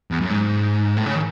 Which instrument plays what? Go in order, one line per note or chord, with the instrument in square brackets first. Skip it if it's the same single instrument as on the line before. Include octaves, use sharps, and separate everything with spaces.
[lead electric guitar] E2
F#2
G#2
A2
C#3
D#3